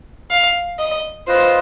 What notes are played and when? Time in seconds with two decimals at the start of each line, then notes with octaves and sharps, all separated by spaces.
0.30 F5
0.79 D#5
1.27 F4 B4 C5 D#5